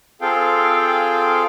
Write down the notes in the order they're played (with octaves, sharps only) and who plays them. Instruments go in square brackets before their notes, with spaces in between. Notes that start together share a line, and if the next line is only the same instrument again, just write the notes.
[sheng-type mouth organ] C4 F4 G#4 A4 F5 G5